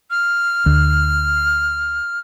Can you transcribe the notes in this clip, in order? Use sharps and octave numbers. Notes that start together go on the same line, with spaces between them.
F6
D2